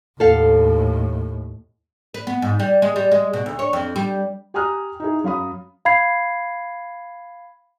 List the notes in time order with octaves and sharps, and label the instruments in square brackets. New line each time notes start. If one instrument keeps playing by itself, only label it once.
[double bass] D#2 A2 [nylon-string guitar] A4 F5
[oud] B4
B3
G#2
G3
G#3
G3
G#3
B2
D2
C#5
F2
G3
[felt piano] G4 G#5 A#5 D#6 F6 F#6
D#4 E4 G#4
F#2 F5 B5 D#6
[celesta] F5 B5 G#6 C7